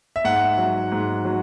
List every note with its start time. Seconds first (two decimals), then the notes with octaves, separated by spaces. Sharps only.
0.16 E5
0.24 G#2 F#5
0.58 F#3
0.92 G#2
1.25 F#3